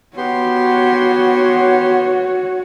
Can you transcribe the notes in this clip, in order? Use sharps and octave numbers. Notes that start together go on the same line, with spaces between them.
B3 F#4 G4 C#5 C6